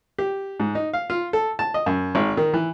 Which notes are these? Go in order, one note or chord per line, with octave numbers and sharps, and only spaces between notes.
G4
G#2
D#4
F5
F4
A4
A5
D#5
F#2
G#1
D#3
E3